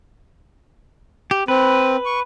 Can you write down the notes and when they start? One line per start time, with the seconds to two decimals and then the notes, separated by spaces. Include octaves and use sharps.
1.31 G4
1.48 C4 B4
2.06 C#6